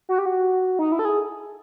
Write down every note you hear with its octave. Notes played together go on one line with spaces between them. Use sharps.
F#4
G4
F#4
D#4
E4
A4
G#4